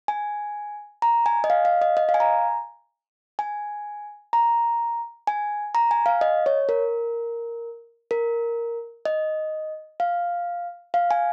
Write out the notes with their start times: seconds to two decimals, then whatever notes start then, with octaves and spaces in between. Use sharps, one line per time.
0.08 G#5
1.02 A#5
1.26 G#5
1.44 D#5
1.50 F5
1.65 F5
1.82 D#5
1.97 D#5
2.09 F5
2.14 G#5
2.20 A#5
3.39 G#5
4.33 A#5
5.27 G#5
5.75 A#5
5.91 G#5
6.06 F5
6.21 D#5
6.46 C#5
6.69 A#4
8.11 A#4
9.05 D#5
10.00 F5
10.94 F5
11.11 G#5